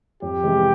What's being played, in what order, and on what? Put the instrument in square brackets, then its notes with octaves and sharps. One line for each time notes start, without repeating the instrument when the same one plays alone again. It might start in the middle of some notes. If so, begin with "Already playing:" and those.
[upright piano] F2 [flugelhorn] G4
[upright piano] C3 E3 G#3